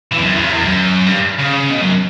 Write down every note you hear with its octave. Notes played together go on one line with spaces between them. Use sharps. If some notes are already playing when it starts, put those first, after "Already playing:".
E3
E2
F#2
E2
F#2
E2
F#2
G2
C#3
B2
F#2